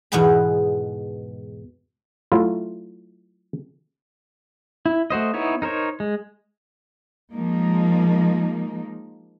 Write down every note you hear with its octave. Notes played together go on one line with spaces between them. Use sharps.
E2 G#2 B2 B3 G#4 B5
F#3 A3 E4 F4
E4
A3 F#4 C5 D#5
B3 D#4 E4 C#5
D#4 A#4 C5 C#5
G#3
F3 G#3 A#3 D#4